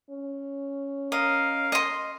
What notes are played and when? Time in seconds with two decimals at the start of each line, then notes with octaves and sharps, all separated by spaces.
0.10 C#4
1.12 A#4 D#5 F5
1.72 D#5 C6